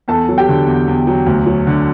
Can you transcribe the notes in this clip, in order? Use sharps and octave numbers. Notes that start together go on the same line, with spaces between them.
E2 A4 A5
F#3
G4 G5
D3
E2
E2
F#3
D2
F#3
D3